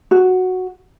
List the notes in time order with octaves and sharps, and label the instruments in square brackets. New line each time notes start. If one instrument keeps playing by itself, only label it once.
[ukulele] F#4